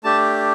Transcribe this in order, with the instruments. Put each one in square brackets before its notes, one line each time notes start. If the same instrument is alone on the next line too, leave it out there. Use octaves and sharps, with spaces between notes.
[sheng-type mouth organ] A3 D4 G4 A5